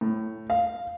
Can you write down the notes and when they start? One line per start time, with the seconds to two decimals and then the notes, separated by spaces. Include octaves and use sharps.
0.01 A2
0.50 F5